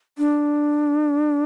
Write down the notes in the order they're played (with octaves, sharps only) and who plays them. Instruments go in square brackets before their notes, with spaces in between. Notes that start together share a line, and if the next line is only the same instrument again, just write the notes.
[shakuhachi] D4